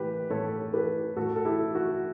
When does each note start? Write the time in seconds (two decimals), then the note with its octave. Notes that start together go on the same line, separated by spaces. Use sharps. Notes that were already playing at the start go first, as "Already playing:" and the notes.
Already playing: A2 E3 G4 B4
0.30 A2 A4 C#5
0.73 E3 G4 B4
1.16 A2 F#4 A4
1.36 A4
1.45 E4 G4
1.59 E3
1.75 F#4